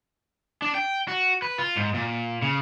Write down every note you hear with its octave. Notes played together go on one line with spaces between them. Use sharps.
D4
G5
F#4
B4
F4
G#2
A#2
C#3